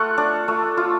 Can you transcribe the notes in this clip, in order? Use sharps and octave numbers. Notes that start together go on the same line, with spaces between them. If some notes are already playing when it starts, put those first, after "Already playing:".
Already playing: A3 F4 F#5
D4
A3
F4